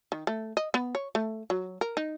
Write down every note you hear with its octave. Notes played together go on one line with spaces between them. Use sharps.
D#3
A3
D#5
B3
C#5
A3
F#3
A#4
D#4